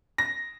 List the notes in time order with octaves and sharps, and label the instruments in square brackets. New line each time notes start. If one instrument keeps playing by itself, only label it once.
[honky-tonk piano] A#6